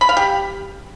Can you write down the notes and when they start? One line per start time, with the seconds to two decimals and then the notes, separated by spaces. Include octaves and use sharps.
0.01 B5
0.09 F5
0.17 G4